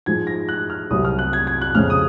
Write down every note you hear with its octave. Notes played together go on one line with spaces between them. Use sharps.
G#2 F3 G#3 G#6
A#6
F#6
F6
C2 C3 F#3 D#6
F6
F#6
G#6
G#6
F#6
F2 C#3 G#3 F6
D#6